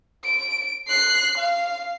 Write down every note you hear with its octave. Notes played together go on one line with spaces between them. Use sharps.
D7
F#6 C7
F5